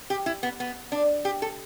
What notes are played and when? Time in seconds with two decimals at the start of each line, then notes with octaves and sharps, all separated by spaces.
0.10 G4
0.26 E4
0.43 B3
0.60 B3
0.92 D4
1.25 G4
1.42 A4